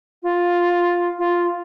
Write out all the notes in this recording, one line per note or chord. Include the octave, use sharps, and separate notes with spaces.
F4
F4